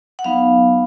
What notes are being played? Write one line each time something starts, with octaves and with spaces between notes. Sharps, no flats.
F#5
F#3 B3 D#4 F5